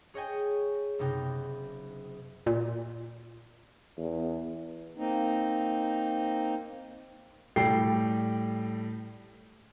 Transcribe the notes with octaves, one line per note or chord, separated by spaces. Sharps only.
G#4 C#5 D#5 G5 G#5
F#1 C3 B3 D#4 G5
A#2
E2
A#3 C4 D#4
A2 G3 G5 C7